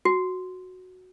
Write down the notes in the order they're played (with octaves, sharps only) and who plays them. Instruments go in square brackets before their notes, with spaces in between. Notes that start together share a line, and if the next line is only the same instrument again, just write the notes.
[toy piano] F#4